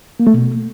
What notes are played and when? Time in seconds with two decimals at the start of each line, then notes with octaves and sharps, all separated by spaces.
0.20 A#3
0.27 A3
0.34 B2